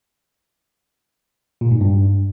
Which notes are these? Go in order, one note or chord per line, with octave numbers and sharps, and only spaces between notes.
A#2
G#2
G2